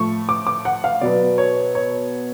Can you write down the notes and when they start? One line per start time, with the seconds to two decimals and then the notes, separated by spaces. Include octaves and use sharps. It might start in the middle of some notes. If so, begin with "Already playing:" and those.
Already playing: A2 F3 A3 C#6
0.29 D6
0.47 D6
0.65 F#5
0.84 F5
1.01 B2 F#3 B3 D5
1.38 C#5
1.75 C#5